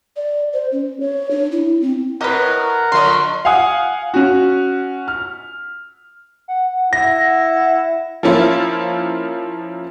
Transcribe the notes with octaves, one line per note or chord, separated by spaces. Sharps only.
D5
C5
C#4
C#5
D4
E4
C4
A2 G4 A#4 B4 D#5 F#5 A#5
D3 F3 A3 D#5 C6
F5 F#5 G#5 D#6
C#4 F#4
F6
F#5
E4 A#6
F3 A#3 C#4 E4 F4